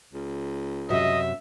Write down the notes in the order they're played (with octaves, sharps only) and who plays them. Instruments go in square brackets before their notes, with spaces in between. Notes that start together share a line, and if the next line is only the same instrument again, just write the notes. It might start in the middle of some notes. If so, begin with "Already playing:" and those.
[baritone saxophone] C#2
[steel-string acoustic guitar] F#2 C3 F#3 [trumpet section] D#5 [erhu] E5